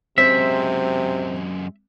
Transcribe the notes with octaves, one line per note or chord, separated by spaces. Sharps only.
F#2 C3 G#3 C4 E5